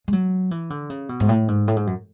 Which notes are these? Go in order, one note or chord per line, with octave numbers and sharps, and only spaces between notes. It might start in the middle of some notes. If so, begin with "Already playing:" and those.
G#3
F#3
E3
D3
C#3
B2
G#2
A2
G#2
A2
G#2
F#2